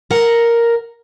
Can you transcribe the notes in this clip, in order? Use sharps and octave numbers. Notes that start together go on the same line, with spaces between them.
A#4 F#5